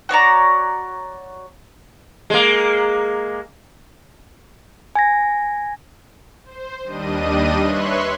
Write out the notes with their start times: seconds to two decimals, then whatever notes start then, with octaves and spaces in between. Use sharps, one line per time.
0.09 F#4 C#5 D5 A#5
2.30 G#3 A#3
4.95 G#5 G#6 A#6
6.45 C5
6.83 D#2 G3 D4 D#5 D#7
7.60 B4 C#5 E5 C6 C#6 F#6